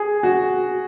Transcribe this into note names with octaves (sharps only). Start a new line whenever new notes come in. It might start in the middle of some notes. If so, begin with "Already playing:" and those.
Already playing: G#4
F#4